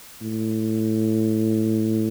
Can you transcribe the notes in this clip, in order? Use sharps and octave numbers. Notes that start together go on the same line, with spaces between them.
A2